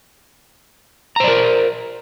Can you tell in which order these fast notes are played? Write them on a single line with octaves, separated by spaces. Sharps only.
A#5 C5 D5 A#4